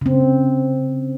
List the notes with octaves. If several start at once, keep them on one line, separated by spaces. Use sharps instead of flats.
C#3 C4